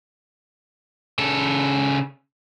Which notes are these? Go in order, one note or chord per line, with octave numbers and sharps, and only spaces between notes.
C#3 A4